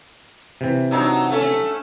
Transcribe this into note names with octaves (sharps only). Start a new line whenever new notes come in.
C3 E3
F#3 D4 D#4
A3 C#4